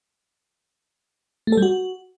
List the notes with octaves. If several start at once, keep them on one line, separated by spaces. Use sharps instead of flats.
A3
A4
G3
F#4